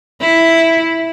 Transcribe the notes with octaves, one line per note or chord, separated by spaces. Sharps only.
E4